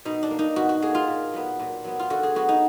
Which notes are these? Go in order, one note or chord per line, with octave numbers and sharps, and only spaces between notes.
B2 D#4
D4
A#3
D#4
B2 F#4
F#4
A#3 G#4
F4
A#2
F#3 B3
A#2
F#3 B3
F4
D3 F#4
G#4
F#3 B3 F#4
D#4